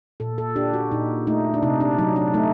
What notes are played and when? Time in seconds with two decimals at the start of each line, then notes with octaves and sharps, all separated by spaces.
0.20 A#2 A4
0.38 A4
0.56 D4 G4
0.74 F#4
0.91 A#2 D#4
1.27 A3 D#4
1.54 D4
1.63 C3 D#4
1.81 D4
1.98 F#3 D#4
2.16 D4
2.34 A3 D#4